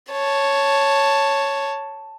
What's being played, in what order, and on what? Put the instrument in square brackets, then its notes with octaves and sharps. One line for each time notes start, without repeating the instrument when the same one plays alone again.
[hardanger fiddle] C#5 A5